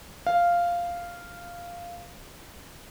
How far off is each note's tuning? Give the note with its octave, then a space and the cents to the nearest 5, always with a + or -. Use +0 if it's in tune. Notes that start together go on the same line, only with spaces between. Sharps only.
F5 -5